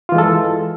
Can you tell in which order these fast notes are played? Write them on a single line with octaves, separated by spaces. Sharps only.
F4 E3 G#3 A4